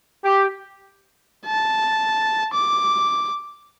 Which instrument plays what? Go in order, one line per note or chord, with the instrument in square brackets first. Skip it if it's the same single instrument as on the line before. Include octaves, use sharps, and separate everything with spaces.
[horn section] G4
[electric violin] A5
D6